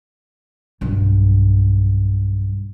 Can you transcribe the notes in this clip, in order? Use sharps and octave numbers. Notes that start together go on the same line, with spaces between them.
B1 G2